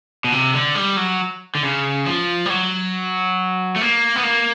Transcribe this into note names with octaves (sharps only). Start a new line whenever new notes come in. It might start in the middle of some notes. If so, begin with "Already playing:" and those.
B2
C3
D3
G3
F#3
D3
C#3
F3
G3
F#3
A3
A#3
B3
A#3